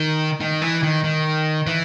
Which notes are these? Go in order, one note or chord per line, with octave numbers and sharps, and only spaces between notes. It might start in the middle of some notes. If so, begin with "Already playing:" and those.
Already playing: D#3
D#3
E3
D#3
D#3
E3